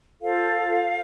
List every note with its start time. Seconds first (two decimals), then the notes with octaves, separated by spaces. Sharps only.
0.21 F4 A4 C5 F5